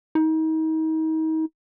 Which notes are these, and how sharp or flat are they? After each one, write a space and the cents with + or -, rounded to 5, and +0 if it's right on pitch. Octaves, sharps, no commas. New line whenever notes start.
D#4 +35